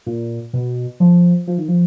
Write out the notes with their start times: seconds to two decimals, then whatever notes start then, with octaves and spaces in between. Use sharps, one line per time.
0.06 A#2
0.53 B2
1.00 F3
1.47 F3
1.58 D#3
1.68 F3